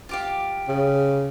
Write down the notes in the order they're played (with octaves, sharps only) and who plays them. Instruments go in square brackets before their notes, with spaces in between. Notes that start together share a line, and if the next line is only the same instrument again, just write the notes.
[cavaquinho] F4 G4 F5
[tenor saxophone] C#3